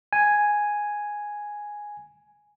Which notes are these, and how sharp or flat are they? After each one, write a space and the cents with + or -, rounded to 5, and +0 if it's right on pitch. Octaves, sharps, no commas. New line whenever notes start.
G#5 +0